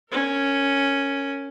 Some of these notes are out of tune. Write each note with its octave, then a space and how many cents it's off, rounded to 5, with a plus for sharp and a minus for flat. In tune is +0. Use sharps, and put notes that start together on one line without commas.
C#4 +0 A#4 -20